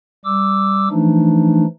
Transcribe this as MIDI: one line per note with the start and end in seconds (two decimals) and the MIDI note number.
0.25 0.88 55
0.25 0.88 86
0.25 0.88 88
0.90 1.65 52
0.90 1.65 53
0.90 1.65 57
0.90 1.65 62
0.90 1.65 63